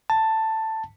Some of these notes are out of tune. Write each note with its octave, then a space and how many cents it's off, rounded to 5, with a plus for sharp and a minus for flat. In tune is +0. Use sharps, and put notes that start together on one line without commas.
A5 +10